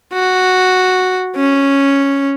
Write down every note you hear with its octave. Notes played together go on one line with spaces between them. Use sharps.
F#4
C#4